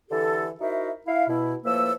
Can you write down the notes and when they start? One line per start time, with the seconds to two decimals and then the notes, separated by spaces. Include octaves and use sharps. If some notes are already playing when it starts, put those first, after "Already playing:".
0.10 D3 E3 G4 A4
0.60 D#4 E4 F#4 A#4 C5 E5
1.07 E4 F5
1.28 B2 E4
1.65 A2 F3 A#3 B4 E6